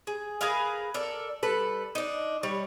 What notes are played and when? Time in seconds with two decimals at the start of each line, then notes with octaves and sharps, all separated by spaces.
0.07 G#4
0.41 G#4 A#4 B4 F5
0.94 A4 A#4 D5
1.43 G3 A4 B4
1.95 D4 D#4
2.43 G3 C#5